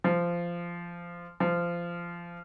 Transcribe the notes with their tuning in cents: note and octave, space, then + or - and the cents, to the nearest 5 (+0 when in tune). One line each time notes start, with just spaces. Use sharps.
F3 -15
F3 -20